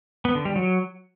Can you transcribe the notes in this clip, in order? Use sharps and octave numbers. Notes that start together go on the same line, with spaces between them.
B3
D3
G3
F#3